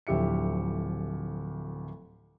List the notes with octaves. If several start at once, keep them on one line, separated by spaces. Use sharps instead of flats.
D1 D2 F3 G4 E5 C#7